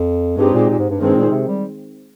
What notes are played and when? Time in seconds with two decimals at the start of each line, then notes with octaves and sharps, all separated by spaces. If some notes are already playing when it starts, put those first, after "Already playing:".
Already playing: F2
0.37 G2 G#3 C4 D#4 G4
0.53 A#2
0.69 A#2
0.79 G#2
0.90 G2
1.00 G2 D#3 G#3 C4
1.15 A#2
1.31 C3
1.48 G3